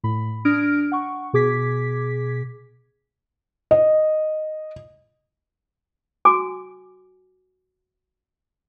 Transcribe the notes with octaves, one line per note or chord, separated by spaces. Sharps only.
A2 B5
D4 D#6 F6 G#6 A#6 D7
F#5 C#6
B2 G#4 D6 G#6 B6
D#5
F#4 G#5 D6